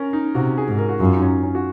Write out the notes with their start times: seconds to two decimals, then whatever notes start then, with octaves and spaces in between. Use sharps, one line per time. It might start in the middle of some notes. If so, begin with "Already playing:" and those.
Already playing: C#4 A#4
0.13 D#4
0.35 C3 F#4
0.58 G#4
0.68 G#2
0.78 A#4
0.89 F#4
1.00 F#2 F4
1.17 D#4
1.22 C#4
1.43 C#4
1.55 F#4